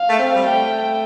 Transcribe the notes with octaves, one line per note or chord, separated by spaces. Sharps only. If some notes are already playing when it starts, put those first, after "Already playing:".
Already playing: F5
A3
C4
G3
A3 G5